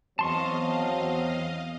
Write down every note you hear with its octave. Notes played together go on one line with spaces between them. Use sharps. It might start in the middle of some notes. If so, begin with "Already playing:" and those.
E2 F#3 C4 D#5 F5 A5 C6 C#6